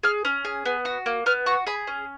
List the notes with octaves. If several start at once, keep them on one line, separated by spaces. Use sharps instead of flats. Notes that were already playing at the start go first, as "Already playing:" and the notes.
G#4 F6
C#4
G#4
B3
F#4
A#3
B3 F6
F#4 C#6
G#4 B5
C#4